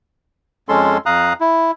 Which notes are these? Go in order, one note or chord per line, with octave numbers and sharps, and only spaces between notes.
F2 G#3 C#4 A4 C6
F2 F5 A#5 D#6 F#6
E4